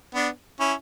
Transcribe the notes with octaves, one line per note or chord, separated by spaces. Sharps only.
B3 D4
C#4 E4